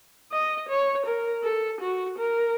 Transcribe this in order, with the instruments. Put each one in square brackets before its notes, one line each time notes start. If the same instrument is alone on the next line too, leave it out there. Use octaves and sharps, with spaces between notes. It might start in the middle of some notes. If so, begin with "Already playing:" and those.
[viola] D#5
C#5
A#4
A4
F#4
A#4